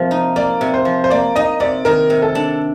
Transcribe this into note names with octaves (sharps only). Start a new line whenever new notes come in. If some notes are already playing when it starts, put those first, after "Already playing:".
Already playing: C3 F3 A#3
D#4
A#3 D5
C3
C5
F3
C5
A#3 D5
D#4 D#5
C3 D5
D#3 A#4
C3
A4
D4